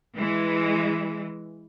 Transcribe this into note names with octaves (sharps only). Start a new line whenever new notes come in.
E3 G#3